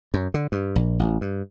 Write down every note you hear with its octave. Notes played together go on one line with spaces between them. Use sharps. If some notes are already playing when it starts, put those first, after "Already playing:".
F#2
D3
G2
A#1
A1
G2